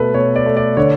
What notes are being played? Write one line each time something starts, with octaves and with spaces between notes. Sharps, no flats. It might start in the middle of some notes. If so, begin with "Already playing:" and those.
Already playing: B2 A3 A4 B4
B2 C#5
D5
A3
D5
D3 C#5